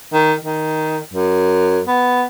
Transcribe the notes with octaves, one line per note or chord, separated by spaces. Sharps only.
D#3
D#3
F#2
B3